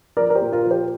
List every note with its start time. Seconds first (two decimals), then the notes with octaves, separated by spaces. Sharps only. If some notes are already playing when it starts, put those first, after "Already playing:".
0.17 F3 A#4 D5
0.30 A#4
0.35 G4 C5
0.41 A#2
0.52 F4 A#4
0.65 F3
0.71 G4 C5